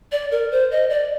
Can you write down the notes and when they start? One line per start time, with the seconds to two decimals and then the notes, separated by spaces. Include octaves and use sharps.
0.12 D5
0.31 A#4
0.52 C5
0.71 D#5
0.90 D5